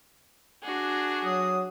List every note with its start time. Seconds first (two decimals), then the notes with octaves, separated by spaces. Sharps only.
0.62 D4 F#4 G#4
1.25 F#3 D#6